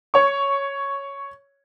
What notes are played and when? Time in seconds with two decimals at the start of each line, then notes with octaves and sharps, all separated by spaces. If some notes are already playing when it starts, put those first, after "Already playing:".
0.14 C#5 C#6